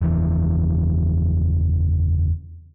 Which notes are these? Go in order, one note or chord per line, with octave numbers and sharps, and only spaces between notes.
F#1 E2 E3